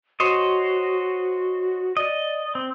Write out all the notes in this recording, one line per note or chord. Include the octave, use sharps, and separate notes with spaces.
F#4 C5 C#5 D#5
D5 D#5
C4